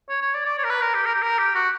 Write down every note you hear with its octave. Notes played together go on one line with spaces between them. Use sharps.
C#5
C#5
D5
D5
C#5
A#4
B4
A#4
G4
A#4
G4
A#4
G4
F#4